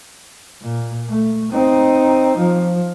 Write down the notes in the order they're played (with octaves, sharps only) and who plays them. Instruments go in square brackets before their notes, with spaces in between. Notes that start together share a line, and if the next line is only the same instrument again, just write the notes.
[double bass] A#2
A3
C4 D#4
F3